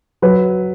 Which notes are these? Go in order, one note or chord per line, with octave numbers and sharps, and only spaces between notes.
F#3 B4